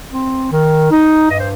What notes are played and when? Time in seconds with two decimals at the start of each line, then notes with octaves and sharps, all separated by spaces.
0.10 C4
0.50 D#3
0.90 D#4
1.29 G2 D#5
1.39 C5